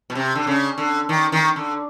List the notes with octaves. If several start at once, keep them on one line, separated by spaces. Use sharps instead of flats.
B2
C3
D3
C#3
D3
D#3
D#3
D3